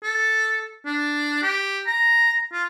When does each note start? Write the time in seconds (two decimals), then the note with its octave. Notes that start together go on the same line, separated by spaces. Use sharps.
0.03 A4
0.85 D4
1.43 G4
1.87 A#5
2.52 F4